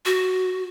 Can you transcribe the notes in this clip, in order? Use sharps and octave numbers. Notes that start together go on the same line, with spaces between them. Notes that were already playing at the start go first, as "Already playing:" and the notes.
F#4